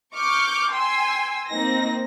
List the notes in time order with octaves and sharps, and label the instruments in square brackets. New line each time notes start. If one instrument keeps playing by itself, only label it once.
[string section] C#6 D6 F6 G6
G5 G#5 C6 E6
A#3 C4 D#4 A#6